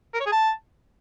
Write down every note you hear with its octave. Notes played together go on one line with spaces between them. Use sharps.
A#4
C#5
G#4
A5